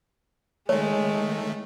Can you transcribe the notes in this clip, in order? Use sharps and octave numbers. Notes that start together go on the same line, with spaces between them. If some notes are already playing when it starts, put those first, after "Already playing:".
D#3 G#3 A3 C#5